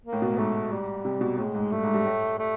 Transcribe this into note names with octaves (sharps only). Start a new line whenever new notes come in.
A#3
A2
B2
A2
G#2 A3
G3
C3
B2
A2 G#3
G#2
G2 A3
G#2
G2
A2
A3